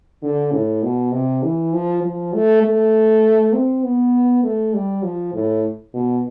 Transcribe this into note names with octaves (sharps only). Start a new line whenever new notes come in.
D3
A2
B2
C3
E3
F3
F3
A3
A3
C4
B3
A3
G3
F3
A2
B2